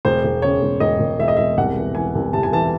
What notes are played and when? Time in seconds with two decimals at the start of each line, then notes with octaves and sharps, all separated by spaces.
0.05 E1 C5
0.25 E1
0.42 C#3 C#5
0.62 E1
0.80 E1 D#5
1.00 E1
1.19 E1 E5
1.28 D#5
1.37 E1 E5
1.57 C2 F#5
1.77 E3
1.95 E3 G#5
2.15 C2
2.33 C3 A5
2.43 G#5
2.52 E3 A5